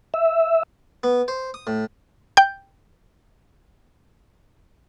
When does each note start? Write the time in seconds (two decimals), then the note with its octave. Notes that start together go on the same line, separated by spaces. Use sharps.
0.14 E5
1.03 B3
1.28 C5
1.54 D#6
1.67 A2
2.37 G5 G6